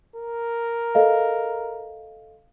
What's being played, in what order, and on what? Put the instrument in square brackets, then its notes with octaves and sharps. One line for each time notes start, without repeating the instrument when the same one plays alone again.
[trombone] A#4
[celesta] A4 D#5 F5